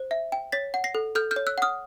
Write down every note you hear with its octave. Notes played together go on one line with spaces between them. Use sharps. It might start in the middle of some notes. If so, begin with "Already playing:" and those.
Already playing: C5
E5
G5
C#5 A6 B6
F#5
A#6 C7
A4
A4 F6 G6
F6 G6
C#5
E6 F#6
F#5 D#6 F6